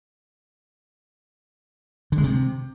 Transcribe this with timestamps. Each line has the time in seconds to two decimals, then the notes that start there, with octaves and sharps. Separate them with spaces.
2.12 D3
2.18 G#3
2.23 C3